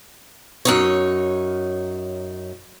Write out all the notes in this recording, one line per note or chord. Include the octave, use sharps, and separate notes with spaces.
F#2 D#4 C#5